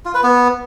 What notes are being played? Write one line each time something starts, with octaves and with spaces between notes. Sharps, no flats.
F4
B4
B3